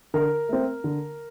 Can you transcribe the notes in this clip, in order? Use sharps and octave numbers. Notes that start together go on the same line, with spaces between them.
D3 A#4
A3 C4
D3